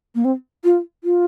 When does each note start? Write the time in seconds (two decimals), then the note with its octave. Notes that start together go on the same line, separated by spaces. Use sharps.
0.15 A#3
0.25 C4
0.64 F4
1.04 F4